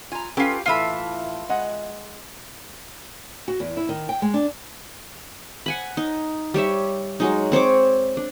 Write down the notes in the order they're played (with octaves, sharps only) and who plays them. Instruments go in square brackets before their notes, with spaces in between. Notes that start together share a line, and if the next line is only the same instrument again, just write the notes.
[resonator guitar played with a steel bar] F4 A#5 [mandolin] G#5
[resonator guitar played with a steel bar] C#4 A4 B4 [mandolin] F4 G4
[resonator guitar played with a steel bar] A2 E3 A4 [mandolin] F4 E5 B5
[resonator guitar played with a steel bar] G#3 D#5 F#5
[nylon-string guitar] F#4
E2
E4
D#3
G5
G#3
D4
[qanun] F#5 G#5 B5
D#4
G3 G4 C#5 E5
F#3 G#3 D#4
C4 C5 C#5 D6
D4